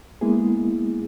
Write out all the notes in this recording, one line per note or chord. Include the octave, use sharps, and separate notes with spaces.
G#3 A#3 B3 E4 G#4